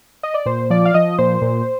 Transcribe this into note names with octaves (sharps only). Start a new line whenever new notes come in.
D#5
D5
A#2 C5
F3 D5
F5
F3 D#5
A#2 C5
A#2